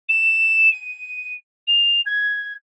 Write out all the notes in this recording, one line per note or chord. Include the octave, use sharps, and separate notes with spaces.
E7
D#7
F7
G#6